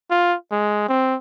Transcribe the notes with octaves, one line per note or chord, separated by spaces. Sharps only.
F4
G#3
C4